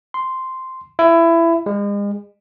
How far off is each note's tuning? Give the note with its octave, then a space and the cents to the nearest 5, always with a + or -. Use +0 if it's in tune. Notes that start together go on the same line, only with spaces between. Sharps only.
C6 -5
E4 +20
G#3 -40